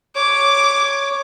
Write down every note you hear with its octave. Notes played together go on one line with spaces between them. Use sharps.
C#5 D6